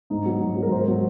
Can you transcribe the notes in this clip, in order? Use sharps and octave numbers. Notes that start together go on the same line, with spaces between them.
G#2 D#4
F#3
G#2
F#3
A#4
G#2 C5
F#3